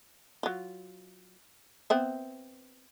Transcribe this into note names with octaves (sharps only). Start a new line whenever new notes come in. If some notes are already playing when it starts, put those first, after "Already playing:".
F#3 F4
B3 C4 E5